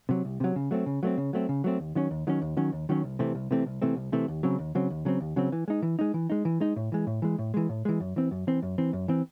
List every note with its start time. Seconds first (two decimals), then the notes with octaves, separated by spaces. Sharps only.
0.09 C3 F#3
0.25 C2
0.40 C3 F#3
0.56 C#3
0.71 F#3 A3 C4
0.86 C#3
1.03 F#3 A3 C4
1.17 C#3
1.33 F#3 A3 C4
1.49 C#3
1.64 F#3 A3 C4
1.80 D#2
1.95 D#3 F#3 C#4
2.11 D#2
2.27 D#3 F#3 C#4
2.42 D#2
2.57 D#3 F#3 C#4
2.72 D#2
2.89 D#3 F#3 C#4
3.04 C2
3.19 C3 E3 A3 C4
3.35 C2
3.51 C3 E3 A3 C4
3.66 C2
3.82 C3 E3 A3 C4
3.96 C2
4.12 C3 E3 A3 C4
4.28 D#2
4.43 C#3 F#3 C4
4.59 D#2
4.75 C#3 F#3 C4
4.90 D#2
5.05 C#3 F#3 C4
5.21 D#2
5.36 C#3 F#3 C4
5.52 E3
5.68 G#3 D#4
5.82 E3
5.99 G#3 D#4
6.14 E3
6.30 G#3 D#4
6.45 E3
6.60 G#3 D#4
6.76 A2
6.92 E3 G#3
7.07 A2
7.22 E3 G#3
7.38 A2
7.54 E3 G#3
7.69 A2
7.85 E3 G#3
8.00 F#2
8.16 E3 C4
8.31 F#2
8.47 E3 C4
8.62 F#2
8.78 E3 C4
8.93 F#2
9.08 E3 C4